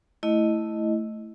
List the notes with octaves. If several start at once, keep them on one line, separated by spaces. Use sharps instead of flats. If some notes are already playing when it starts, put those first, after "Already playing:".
A3 E4 D#5